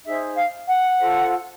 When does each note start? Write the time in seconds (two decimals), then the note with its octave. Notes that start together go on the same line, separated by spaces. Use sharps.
0.05 D#4 G#4 C5 E5
0.36 F5
0.68 F#5
1.00 F4 A4 C5